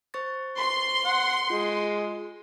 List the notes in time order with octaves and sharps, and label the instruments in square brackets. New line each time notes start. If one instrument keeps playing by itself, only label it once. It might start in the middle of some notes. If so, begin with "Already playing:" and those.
[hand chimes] C5 C#6 A6
[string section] C6
[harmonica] F#5
[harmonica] G#3 [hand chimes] F4